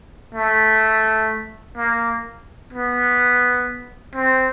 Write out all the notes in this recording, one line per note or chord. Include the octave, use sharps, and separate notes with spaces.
A3
A#3
B3
C4